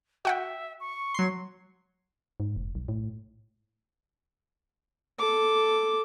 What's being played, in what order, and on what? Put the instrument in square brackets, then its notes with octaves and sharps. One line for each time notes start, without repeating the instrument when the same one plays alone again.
[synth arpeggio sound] F#4 F#5 G5 [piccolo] E5
[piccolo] C#6
[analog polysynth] F#3 C6
[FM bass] G#2
F1
B1
A2
[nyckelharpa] A4 D6